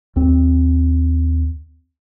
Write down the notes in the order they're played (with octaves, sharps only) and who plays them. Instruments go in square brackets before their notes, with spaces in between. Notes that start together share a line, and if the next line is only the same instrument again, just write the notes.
[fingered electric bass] D#2 C4